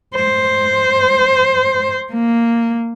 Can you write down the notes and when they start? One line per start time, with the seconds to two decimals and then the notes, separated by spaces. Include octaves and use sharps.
0.15 C5
2.13 A#3